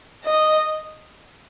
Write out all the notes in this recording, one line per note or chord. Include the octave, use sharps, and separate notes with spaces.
D#5